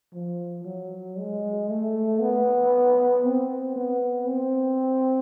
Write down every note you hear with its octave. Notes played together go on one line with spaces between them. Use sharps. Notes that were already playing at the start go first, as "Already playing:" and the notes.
F3
F#3
G#3
A3
B3
C4
B3
C4